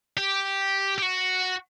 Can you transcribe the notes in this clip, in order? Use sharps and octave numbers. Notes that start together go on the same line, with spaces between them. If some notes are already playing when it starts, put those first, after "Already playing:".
G4
G4
F#4